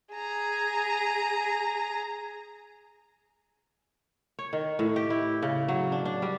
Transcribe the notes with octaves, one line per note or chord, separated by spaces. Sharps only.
G#4 A#5
C#5
D#3
A2
G4
E4
C#3
F#3
D4
D4
G3